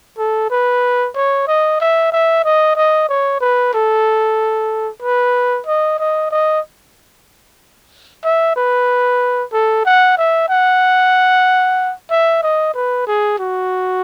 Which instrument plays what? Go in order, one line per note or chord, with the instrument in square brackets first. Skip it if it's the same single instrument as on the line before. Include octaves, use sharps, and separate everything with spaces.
[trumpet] A4
B4
C#5
D#5
E5
E5
D#5
D#5
C#5
B4
A4
B4
D#5
D#5
D#5
E5
B4
A4
F#5
E5
F#5
E5
D#5
B4
G#4
F#4